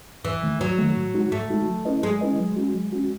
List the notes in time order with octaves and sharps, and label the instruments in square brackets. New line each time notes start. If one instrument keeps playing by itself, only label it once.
[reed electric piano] E2 [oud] E3
[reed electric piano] D#3 A3
[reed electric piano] E2 [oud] F#3
[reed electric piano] D#3 A3
A2
G#3 D#4 F#4
[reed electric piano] A2 [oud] A3
[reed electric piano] G#3 D#4 F#4
F#3
C#4 E4 B4 D#5
[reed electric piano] F#3 [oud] G#3
[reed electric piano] C#4 E4 B4 D#5
F#3
C#4 F#4
F#3
C#4 F#4